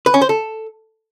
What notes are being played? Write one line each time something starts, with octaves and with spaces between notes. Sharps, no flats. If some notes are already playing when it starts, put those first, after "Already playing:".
B4
C#4
C5
A4